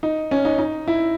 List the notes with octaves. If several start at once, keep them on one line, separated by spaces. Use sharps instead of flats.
D#4
C#4
D#4
D#4
E4